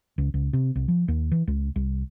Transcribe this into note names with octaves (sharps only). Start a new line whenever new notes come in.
C#2
C#2
C3
C2
F3
D#2
E3
C#2
C2